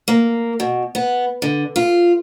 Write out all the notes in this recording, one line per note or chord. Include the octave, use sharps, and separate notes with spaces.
A#3
B2
B3
D3
F4